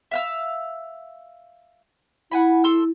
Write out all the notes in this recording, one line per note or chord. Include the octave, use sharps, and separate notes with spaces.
E5 F5 E6
E4 F#5 G#5 B5
A4 C6 E6